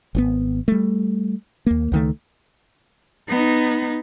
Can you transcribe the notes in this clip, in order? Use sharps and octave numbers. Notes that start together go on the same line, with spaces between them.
G#1 D3 B3
G3 A3
D#2 A#3
C#2 D#3 A3
B3 D#4